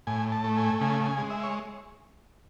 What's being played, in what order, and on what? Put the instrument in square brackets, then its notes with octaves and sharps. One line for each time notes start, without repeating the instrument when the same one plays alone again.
[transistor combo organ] A2 G#5
A5
A3
G#5
C#3 G#5
G#5
G#3
E5
C#5